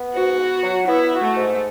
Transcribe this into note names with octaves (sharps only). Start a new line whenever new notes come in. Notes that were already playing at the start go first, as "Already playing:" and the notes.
Already playing: B3
G#2 F#4
B3
F#3
B3 E4
F#4
A3
G#2